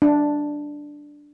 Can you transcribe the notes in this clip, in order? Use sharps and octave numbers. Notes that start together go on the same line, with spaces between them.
D4